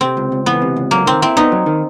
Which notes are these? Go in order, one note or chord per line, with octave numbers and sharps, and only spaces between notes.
C3 C4
C#2
C#2
E3 B3
C3
C#2
F#3 A#3
D#3 C4
C4 E4
B3 D#4
F#3
D#3